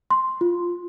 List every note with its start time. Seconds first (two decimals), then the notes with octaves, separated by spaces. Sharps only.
0.10 C6
0.41 F4